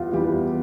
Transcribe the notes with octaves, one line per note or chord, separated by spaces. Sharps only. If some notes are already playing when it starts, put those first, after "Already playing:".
Already playing: E2 G3 F4
E3 G3 G4